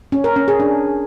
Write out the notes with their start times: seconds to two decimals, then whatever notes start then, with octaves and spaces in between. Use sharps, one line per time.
0.12 C#4
0.24 A#4
0.36 C#4
0.48 G#4
0.60 D4